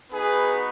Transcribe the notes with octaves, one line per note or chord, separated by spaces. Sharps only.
B3 D#4 F#4 G#4 B4